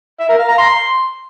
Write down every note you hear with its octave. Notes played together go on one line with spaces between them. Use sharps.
E5
A#4
F5
A#5
C6